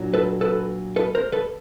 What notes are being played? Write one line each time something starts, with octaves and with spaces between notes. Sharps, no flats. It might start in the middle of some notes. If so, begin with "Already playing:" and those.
Already playing: A#2 F#3 D4
A4 B4
A4 B4
A4 B4
A#4 C5
A4 B4